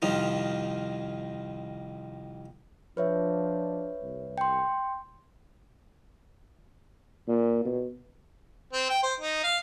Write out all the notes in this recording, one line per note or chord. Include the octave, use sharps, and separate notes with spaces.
C2 F2 D#3 D#4 F4
F3 D4 B4 C#5 E5
C2
G5 C6
A#2
B2
C4
G5
C5
D#4
F5